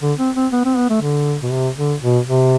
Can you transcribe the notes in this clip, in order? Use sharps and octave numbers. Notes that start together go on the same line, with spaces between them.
D3
C4
C4
B3
C4
B3
A3
D3
B2
C3
D3
B2
C3